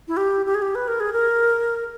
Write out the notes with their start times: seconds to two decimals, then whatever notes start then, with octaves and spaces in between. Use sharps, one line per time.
0.08 E4
0.17 G4
0.46 G4
0.55 G#4
0.62 G4
0.75 B4
0.88 A#4
1.00 G#4
1.13 A#4